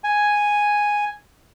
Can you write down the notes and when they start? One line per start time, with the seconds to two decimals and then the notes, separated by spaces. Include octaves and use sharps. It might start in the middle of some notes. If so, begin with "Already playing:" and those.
0.04 G#5